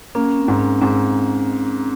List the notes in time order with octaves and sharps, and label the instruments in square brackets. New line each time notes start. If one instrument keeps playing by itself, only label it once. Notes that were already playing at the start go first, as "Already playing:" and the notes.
[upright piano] A#3 [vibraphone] C#4
[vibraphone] C#4
C4
[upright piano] G#2
[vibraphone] C#4
[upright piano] G#2 [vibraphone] C4